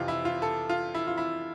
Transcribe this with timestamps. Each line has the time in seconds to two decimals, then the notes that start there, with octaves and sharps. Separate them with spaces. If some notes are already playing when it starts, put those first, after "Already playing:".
Already playing: F2 C3 E3 F4
0.08 E4
0.25 F4
0.42 A4
0.69 F4
0.95 E4
1.07 F4
1.18 E4